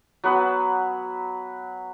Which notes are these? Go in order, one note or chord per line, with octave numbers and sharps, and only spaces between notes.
F#3 B3 B4 D#6